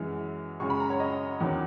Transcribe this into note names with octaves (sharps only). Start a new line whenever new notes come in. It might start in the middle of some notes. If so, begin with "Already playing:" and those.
Already playing: F#2 E3 G#3
F#2 C#3 G#3 C#6
B5
A#5
C#5
D#5
E2 D#3 F#3